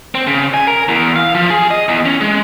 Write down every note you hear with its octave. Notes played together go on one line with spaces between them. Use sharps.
C4
C#3
G#5
A#4
E2
F5
F3
G#4
D#5
E2
C#4
G#3